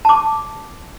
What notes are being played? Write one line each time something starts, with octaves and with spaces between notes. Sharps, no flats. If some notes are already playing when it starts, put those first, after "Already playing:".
A5 D6